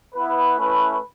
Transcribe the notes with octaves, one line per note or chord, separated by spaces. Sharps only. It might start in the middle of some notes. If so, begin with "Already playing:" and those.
B3 E4 B4
A3 C#4 E4